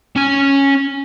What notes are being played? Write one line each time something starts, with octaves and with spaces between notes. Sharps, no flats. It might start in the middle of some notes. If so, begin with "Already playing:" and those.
C#4 G#5